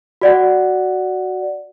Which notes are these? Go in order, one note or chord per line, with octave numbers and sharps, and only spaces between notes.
F#4 D5 F#5